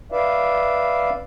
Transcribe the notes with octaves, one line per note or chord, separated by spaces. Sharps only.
B4 D5 E5 F5